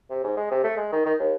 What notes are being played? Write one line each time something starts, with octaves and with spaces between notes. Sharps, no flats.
C3
G#2
G#3
C3
A3
G#3
D#3
D#3
D#2